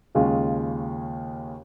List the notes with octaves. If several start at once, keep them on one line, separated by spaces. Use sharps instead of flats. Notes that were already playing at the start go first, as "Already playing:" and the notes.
D#2 C#3 G#3 C#4 F4